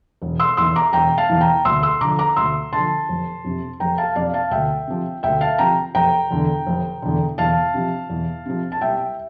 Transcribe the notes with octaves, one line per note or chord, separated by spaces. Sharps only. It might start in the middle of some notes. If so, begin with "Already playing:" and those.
E1
C6 E6
E2 E3 C6 E6
A#5 D6
E1 G5 A#5
F5 A5
E2 E3
G5 A#5
D2 C6 E6
C6 E6
D3 F3 A#5 D6
A#5 D6
D2 C6 E6
D3 F3 A5 C6
F1
F2 C3
F1 G5 A#5
F5 A5
F2 C3 D5 F5
F5 A5
D2 E5 G5
C3 F3
D2 E5 G5
F5 A5
C3 F3 G5 A#5
F1 G5 A#5
E2 D3
F1
E2 D3
E2 F5 A5
C3 F3
E2
C3 F3
A5
C2 E5 G5